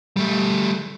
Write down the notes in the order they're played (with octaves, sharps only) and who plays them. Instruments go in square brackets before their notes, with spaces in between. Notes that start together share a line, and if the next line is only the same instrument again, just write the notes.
[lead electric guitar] G3 A3